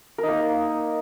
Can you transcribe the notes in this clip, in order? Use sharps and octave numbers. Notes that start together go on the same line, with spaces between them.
A#3 D#4 A#4